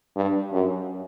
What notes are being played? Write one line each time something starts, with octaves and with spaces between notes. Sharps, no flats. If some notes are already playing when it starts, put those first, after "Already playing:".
G2
F#2